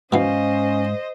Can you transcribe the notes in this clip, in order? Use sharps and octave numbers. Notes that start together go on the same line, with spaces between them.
G#2 B2 E3 C#4 C5 D#5 F5